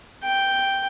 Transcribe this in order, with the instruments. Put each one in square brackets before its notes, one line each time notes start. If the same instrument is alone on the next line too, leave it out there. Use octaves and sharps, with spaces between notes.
[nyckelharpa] G5